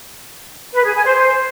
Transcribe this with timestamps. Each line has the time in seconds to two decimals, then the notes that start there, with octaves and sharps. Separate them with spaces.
0.73 B4
0.84 G#4
0.94 G#5
1.04 C5